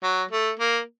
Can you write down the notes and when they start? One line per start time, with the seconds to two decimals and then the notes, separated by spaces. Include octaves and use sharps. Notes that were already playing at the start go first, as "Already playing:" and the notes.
0.03 F#3
0.31 A3
0.59 A#3